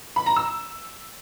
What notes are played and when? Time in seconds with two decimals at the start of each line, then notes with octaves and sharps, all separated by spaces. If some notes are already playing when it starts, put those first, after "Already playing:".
0.16 B5
0.26 A#5
0.36 E6